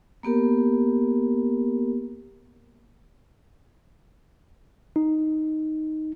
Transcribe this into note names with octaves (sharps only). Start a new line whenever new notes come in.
A#3 B3 G4 A#4
D#4